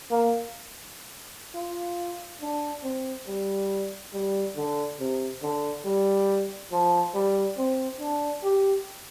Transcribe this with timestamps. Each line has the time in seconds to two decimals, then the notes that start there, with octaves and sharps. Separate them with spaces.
0.11 A#3
1.55 F4
2.41 D4
2.83 C4
3.27 G3
4.13 G3
4.56 D3
5.00 C3
5.42 D3
5.85 G3
6.72 F3
7.14 G3
7.58 C4
8.00 D4
8.44 G4